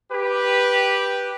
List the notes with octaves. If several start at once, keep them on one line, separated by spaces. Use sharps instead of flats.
G4 B4